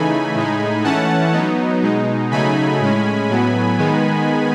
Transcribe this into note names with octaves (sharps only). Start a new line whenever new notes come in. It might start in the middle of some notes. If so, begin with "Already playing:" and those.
Already playing: C#3 E3 A3 D#4 G#5 B5
A2 G#3 D#4
E3 A3 C#4 F#5 A5
F#3 B3 D#4
B2 G#3 D#4
C#3 F#3 A3 D#4 G#5 B5
A2 G#3 C#4
A2 F#3 B3
D#3 G#3 B3 D#4